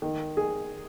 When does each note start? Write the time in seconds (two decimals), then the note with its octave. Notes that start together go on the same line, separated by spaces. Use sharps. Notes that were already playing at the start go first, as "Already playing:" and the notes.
0.02 D#3
0.37 G#4